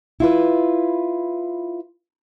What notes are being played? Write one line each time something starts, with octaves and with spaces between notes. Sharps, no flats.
E4 F4 B4